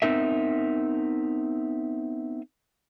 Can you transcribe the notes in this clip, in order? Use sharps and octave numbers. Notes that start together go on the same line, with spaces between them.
B3 C4 D#4 A#4 E5